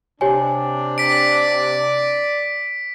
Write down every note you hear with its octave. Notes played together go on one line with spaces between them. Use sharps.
C3 D4 G4 C#5 G#5
D5 B6 D7